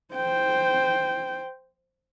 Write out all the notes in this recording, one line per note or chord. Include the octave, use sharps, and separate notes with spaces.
C5 G5